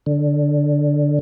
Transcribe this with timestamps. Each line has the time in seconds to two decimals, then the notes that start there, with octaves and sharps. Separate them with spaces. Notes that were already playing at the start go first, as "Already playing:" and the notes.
0.06 D3